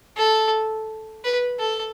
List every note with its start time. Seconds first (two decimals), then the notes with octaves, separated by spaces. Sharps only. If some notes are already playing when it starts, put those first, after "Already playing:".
0.17 A4
1.24 B4
1.60 A4